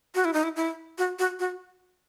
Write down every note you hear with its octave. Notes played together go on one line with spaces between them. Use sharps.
F#4
E4
D#4
E4
E4
F#4
F#4
F#4